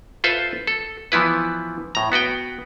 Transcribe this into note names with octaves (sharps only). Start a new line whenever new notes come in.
F4 A4 B4 C5 E5
A4
E3 F3 B3 E4 B4
A2 A#5
B3 F#4 B4 G5